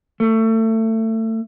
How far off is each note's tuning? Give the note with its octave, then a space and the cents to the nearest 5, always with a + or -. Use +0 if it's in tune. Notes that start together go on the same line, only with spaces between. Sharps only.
A3 +25